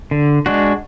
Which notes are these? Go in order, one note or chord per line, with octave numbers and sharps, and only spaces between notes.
D3
G#3 D4 F#4